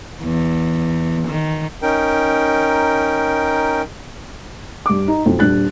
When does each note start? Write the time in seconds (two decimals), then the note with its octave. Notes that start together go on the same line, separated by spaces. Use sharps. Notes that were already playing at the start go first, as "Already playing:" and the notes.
0.22 E2
1.28 D#3
1.82 C#4 D#4 A#4 G5
4.86 G2 D6
5.08 D#4
5.26 B1 F2
5.39 D#1 D4 F#6 A6